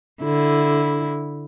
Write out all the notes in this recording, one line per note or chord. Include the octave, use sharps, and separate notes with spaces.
D3 E4